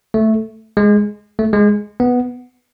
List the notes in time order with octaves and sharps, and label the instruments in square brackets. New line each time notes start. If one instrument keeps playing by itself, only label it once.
[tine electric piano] A3
G#3
A3
G#3
B3